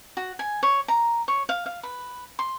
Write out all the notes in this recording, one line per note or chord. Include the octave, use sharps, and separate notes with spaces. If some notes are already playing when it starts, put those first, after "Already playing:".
F#4
G#5
C#5
A#5
C#5
F5
F5
B4
C6